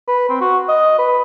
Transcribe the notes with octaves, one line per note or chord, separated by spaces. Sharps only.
B4
C4
F#4
D#5
B4